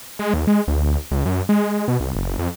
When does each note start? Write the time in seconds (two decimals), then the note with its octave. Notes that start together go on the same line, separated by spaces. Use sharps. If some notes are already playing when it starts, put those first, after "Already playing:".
0.19 G#3
0.34 D#2
0.47 G#3
0.67 D2
1.11 C#2
1.25 F#2
1.49 G#3
1.88 B2
2.00 C2
2.16 F#1
2.39 F2